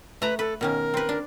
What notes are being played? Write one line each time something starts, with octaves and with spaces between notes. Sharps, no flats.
A3 B4 A#5
A4 B4
B2 D#3 C#4 A#4
C4 B4
D4